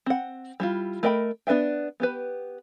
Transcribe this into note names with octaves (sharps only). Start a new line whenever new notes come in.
C4 F#5
G3 E4 F4
A3 A#4 D#5 G5 B5
B3 D4 B4 E5 G5
B3 G4 B4